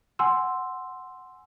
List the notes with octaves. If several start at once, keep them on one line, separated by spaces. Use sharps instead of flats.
F#5 G#5 C6 E6